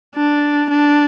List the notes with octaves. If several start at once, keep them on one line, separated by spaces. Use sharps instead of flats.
D4
D4